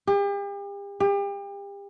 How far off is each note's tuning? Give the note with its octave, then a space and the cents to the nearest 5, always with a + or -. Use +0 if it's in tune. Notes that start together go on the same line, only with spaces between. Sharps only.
G4 +40
G4 +35